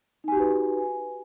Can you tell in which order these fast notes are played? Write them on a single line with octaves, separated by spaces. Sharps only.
D#4 G#5 G4 F#4 B4